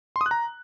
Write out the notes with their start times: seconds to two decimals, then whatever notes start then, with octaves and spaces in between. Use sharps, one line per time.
0.16 C6
0.21 D#6
0.26 F#6
0.31 A#5